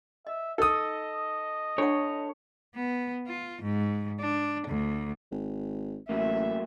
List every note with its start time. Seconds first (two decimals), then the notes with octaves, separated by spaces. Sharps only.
0.27 D#5 E5
0.58 D#4 A4 D#5 D#6
1.78 D4 A4 C#5 F#5
2.75 B3
3.27 F4
3.62 G#2
4.20 D4
4.67 D2
5.31 G#1
6.09 A1 F#3 A3 A#3 E5